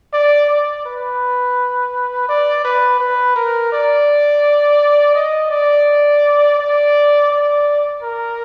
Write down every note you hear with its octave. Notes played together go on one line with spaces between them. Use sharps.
D5
D5
B4
D5
B4
B4
A#4
D5
D#5
D5
D5
D5
A#4